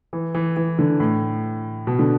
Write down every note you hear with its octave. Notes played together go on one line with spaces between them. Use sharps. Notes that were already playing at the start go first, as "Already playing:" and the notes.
E3
E3
E3
D3
A2
B2
D3